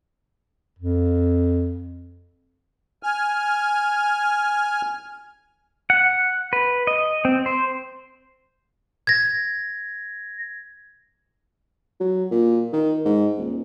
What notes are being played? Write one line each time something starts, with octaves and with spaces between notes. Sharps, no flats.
F2
G#5 F6
F#5
B4
D#5
C4
C5
G#6 A#6
F#3
A#2
D#3
G#2
D#1